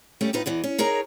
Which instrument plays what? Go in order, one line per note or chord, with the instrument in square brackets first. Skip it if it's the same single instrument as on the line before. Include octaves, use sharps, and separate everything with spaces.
[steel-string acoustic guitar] G3 A3 C#4 G4
D#2 A2 D#4 F4 B4
E2 B2 E3
C#4
D#4 G#4 A#4 C#5 A#5